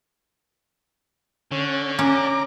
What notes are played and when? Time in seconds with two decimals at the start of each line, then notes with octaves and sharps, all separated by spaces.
1.52 D3 C#4
1.99 C#4 A#5 D6